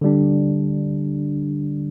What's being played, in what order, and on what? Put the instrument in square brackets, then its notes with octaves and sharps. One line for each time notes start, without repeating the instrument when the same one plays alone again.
[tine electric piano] D3 G3 D4